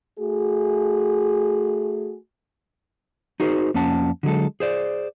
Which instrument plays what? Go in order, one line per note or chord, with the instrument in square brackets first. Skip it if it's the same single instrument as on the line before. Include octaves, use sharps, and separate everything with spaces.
[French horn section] A3 F#4 G#4
[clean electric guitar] D#4 F#4 G#4 A#4 C5
F2 A#3 C#4 F#5 A5
D3 F#3 G#3 A4
G#4 C5 D5